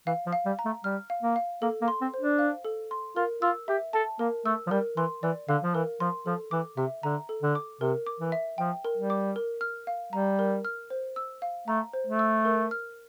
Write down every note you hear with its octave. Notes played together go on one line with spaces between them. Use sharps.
E3 F5
F3
F5
G3
A#5
A3
G3 F6
F5
A#3
F5
A#3 A4
A#3
C6
C4
C5
D4
F5
A4
C6
F4 A#4
F4 E6
G4 E5
A4 A5
A#3 A#4
A3 E6
F3
G3 A#4
E3 C6
E3 D5
D3 F5
F3
E3 A#4
F3 C6
F3 A4
E3 D6
C3 E5
D3 A#5
A4
D3
D6
C3 A#4
D6
E3
E5
F3 G5
A#4
G3
D6
A#4
F6
F5
G3 A#5
A#4
F6
C5
E6
F5
A3 A#5
C5
A3
E6
A#4
F6